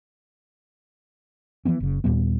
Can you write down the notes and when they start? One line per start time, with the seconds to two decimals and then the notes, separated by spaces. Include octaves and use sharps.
1.65 E3 F3 B3 C#4
1.80 F#1 C#3
2.04 D#2 A#2 G3 B3